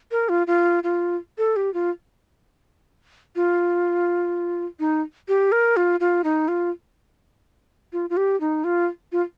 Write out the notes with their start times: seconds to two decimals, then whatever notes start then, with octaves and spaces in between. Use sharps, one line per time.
0.11 A#4
0.29 F4
0.47 F4
0.84 F4
1.38 A4
1.56 G4
1.74 F4
3.36 F4
4.80 D#4
5.28 G4
5.52 A#4
5.77 F4
6.00 F4
6.24 D#4
6.48 F4
7.93 F4
8.10 F4
8.17 G4
8.40 D#4
8.64 F4
9.12 F4